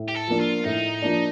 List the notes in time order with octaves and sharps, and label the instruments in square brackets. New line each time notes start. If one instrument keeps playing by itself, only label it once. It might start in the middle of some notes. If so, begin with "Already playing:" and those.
Already playing: [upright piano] A2
[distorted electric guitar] G4
A4
[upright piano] F3 A#3 D4
[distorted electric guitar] F4
[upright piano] A2 [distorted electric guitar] D#4
[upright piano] F3 A#3 D4